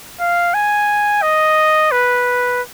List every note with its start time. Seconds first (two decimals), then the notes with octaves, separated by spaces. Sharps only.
0.20 F5
0.54 G#5
1.22 D#5
1.91 B4